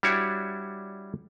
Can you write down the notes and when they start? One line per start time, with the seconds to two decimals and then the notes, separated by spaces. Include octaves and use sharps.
0.03 G3 D4 E4 F#4 C#5 D5